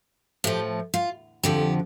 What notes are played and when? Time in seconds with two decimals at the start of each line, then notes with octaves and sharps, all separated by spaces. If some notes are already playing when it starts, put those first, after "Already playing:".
0.44 A2 F3 G4
0.94 F4
1.43 F2 D3 F3 G4